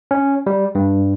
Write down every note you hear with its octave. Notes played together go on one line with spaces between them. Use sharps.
C#4
G3
G2